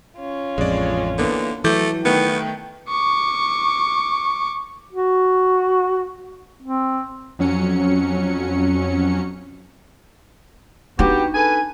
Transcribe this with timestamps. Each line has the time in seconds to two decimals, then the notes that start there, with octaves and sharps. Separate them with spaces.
0.18 C#4 F4
0.58 A1 F2 G#3 D5
1.18 D3 E3 A#3 B3
1.64 E3 F#3 A3 D6 G6
2.05 D#3 A3 B3 G5
2.89 C#6 D6
4.93 F#4
6.62 C4
7.39 F2 F#3 C#4 C#7
10.99 B3 D4 D#4 F#4 G4
11.35 A4 B4 G#5